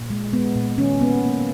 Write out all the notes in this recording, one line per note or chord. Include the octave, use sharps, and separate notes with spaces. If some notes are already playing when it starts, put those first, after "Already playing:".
Already playing: A#2
G#3
G#3 B3
A#2
D#3 C#4
A#3 B3
A#3